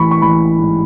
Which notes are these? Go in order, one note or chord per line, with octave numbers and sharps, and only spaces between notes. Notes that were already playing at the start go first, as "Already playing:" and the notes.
Already playing: A1 E3 B5 C#6
C#6
A1 B5
G#2